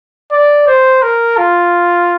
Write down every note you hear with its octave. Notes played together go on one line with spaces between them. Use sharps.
D5
C5
A#4
F4